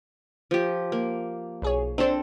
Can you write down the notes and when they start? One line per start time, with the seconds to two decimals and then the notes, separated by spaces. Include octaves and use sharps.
0.51 F3 G4
0.92 A#3
1.62 B1 G#4 C#5
1.98 C4 D4 A4 C5